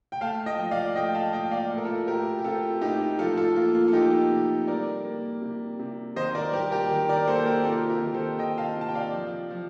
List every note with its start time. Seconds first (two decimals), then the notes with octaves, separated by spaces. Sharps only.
0.12 G5
0.21 A3 F5 A5
0.46 D#5 G5
0.59 F3
0.71 D5 F5
0.95 A3 D#5 G5
1.15 F5 A5
1.33 A#2 D#5 G5
1.51 D5 F5
1.70 A2 A4
1.78 A#4
1.85 F4 A4
2.07 A2 G4 A#4
2.39 G4
2.44 C4 F4 A4
2.81 A2 D#4 G4
3.19 F3 F4 A4
3.37 F4 A4
3.56 A#3 F4
3.75 F4
3.88 A4
3.93 F3 D#4 G4
4.31 C3
4.67 G3 A#4 D5
5.05 A#3
5.42 C3
5.79 C3
6.16 D#3 C5 D#5
6.35 A#4 D5
6.53 G3 G4 A#4
6.72 G4 A#4
6.91 D#3
7.09 A#4 D5
7.28 A#3 A4 C5
7.40 C5
7.46 G4 A#4
7.65 C3 F4 A4
7.89 G4 A#4
8.02 D#3
8.14 A4 C5
8.39 D#3 D#5 G5
8.58 F5 A5
8.77 C3 A5
8.88 G5
8.95 D5 F5
9.14 F3
9.50 F3